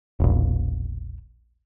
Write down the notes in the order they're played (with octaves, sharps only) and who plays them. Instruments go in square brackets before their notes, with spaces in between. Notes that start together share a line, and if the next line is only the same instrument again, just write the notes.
[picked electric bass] E1 A#1